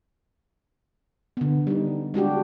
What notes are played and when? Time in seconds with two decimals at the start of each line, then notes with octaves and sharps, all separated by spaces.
1.37 D3 B3
1.67 G3 D#4
2.14 G#3 D4 F#4 G4